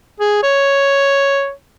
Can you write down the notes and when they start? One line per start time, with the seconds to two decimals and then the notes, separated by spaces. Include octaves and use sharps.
0.20 G#4
0.43 C#5